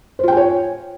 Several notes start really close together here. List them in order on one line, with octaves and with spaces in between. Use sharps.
C5 F4 G5 G#5 C#5